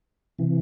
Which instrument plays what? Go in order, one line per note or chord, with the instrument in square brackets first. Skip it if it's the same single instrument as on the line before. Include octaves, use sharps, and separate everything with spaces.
[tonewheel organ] C3 E3